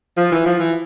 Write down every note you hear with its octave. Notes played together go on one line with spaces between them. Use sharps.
F3
E3
F3
E3